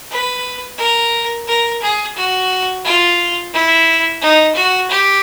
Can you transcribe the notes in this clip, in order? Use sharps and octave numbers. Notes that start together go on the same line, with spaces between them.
B4
A#4
A#4
G#4
F#4
F4
E4
D#4
F#4
G4